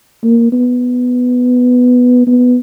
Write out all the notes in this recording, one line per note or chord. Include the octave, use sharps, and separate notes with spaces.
A#3
B3
B3